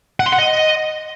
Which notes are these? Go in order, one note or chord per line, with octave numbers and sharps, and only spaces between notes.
F#5
C6
F#5
D#5